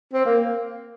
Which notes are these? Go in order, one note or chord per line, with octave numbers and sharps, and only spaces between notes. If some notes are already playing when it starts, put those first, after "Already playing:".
C4
A#3